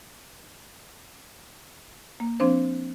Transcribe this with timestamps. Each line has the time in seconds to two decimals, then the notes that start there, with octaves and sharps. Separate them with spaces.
2.20 A#3
2.40 F3 C4 D4 C5